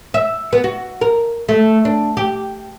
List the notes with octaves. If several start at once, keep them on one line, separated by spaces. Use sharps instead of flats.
E5
B3
F#4
A#4
A3
D4
G4